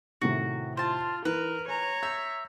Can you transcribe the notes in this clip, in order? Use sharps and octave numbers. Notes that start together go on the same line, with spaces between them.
A2 C3 D#3 F#4
F4 C5 A5
E3 A#4 B4
C#5 G#5 A#5
E5 G6